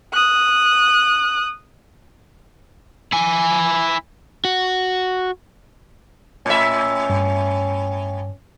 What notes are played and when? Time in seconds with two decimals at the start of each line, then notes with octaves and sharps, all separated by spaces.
0.13 D#6 F#6
3.12 E4 G#5
4.45 F#4
6.46 A2 C#4 E5
7.10 G2